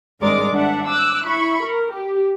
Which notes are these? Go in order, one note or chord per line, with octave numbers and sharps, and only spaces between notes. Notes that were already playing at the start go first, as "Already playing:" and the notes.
G#1 G2 G#3 A#4 D5 D6
G#1 D4 E5 F#5
D6 E6 F#6
E4 B5 C#6
A#4
G4